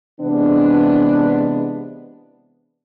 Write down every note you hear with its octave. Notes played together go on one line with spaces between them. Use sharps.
C3 E3 G#3 B3 D4